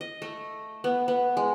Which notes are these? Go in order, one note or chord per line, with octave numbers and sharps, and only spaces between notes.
D#5
A3
B3
B3
G#3